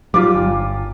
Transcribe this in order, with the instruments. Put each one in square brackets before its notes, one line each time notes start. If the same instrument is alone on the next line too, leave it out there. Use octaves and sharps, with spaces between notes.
[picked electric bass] F#3 G3 [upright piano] F4 D6
[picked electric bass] G1